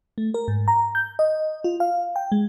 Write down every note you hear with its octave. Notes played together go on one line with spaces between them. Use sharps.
A3
A#4
G#2
A#5
G6
D#5
F4
F5
G5
G#3